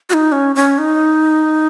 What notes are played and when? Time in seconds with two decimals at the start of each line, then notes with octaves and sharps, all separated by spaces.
0.10 F#4
0.14 D#4
0.32 C#4
0.55 C#4
0.78 D#4